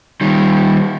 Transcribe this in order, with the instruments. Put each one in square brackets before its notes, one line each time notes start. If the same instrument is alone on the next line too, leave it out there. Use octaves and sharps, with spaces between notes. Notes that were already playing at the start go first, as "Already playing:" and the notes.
[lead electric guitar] D#3 G3